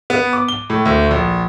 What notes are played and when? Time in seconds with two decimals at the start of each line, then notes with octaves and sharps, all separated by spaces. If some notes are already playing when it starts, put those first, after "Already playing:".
0.10 B3
0.33 D6
0.48 G7
0.70 A2
0.85 D2
1.11 A#1